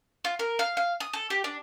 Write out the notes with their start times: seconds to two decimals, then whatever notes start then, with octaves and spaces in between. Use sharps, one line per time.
0.25 F4
0.39 A#4
0.59 F5
0.77 F5
1.00 D#6
1.13 A4
1.30 G4
1.44 D4